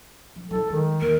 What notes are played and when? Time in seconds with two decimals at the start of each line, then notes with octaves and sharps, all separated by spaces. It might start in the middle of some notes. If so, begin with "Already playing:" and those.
0.36 F3
0.51 F#3 E4 A4
0.70 D#3 G3 G#3
1.01 D#2 A#4